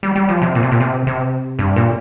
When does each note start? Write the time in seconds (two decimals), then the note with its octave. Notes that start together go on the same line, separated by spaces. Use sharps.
0.03 G3
0.16 G3
0.29 F3
0.42 C3
0.55 A#2
0.63 C3
0.72 A#2
0.80 C3
1.07 C3
1.59 G2
1.76 A#2